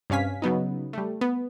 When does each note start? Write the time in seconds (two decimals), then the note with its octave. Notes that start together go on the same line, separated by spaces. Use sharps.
0.10 G2 C3 C#4 F5 G#5 B6
0.42 C#3 F#3 B3 D#4
0.93 G3 A3
1.21 B3